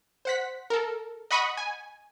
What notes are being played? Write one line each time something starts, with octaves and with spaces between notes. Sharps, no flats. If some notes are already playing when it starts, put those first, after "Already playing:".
C5 F#5 B6
A4 A#4
D#5 F#5 B5 C#6 D#6
G#5